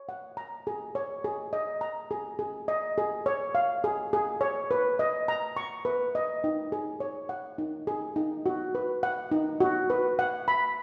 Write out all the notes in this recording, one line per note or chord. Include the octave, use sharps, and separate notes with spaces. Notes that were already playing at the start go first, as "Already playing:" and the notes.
Already playing: C#5
F#5
A#5
G#4
C#5
G#4
D#5
A#5
G#4
G#4
D#5
G#4
C#5
F5
G#4
G#4
C#5
B4
D#5
A#5
C#6
B4
D#5
D#4
G#4
C#5
F#5
D#4
G#4
D#4
F#4
B4
F#5
D#4
F#4
B4
F#5
B5